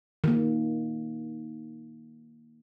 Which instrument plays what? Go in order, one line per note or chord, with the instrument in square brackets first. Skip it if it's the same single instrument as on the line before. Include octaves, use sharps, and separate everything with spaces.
[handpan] D#3 A#3